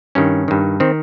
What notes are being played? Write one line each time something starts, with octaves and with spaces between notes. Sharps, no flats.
G2 D#3 C#4
G2 D#3
D#3 C4